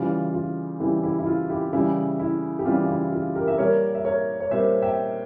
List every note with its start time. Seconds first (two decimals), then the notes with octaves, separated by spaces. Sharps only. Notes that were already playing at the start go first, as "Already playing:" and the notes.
Already playing: C#3 E3 G3 F4
0.34 F4
0.80 C#3 E3 G3 E4 G4
1.03 E4 G4
1.19 E4
1.26 F4
1.50 E4 G4
1.73 C#3 E3 G3 E4 G4
2.20 E4
2.59 G4
2.66 C#3 E3 G3 F4
2.89 E4
3.12 F4
3.35 G4 A#4
3.48 E5
3.58 A#2 G3 A#4 C#5
3.95 E5
4.05 A#4 C#5
4.40 C#5
4.51 A#2 G3 C5 E5
4.82 E5 G5